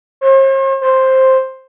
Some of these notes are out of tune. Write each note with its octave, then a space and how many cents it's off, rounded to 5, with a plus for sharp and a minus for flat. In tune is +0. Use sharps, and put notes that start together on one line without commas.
C5 +45
C5 +5